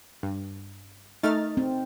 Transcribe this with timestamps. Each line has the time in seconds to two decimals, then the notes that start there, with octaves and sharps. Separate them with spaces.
0.23 G2
1.23 A3 D#4 F6 A6
1.57 C4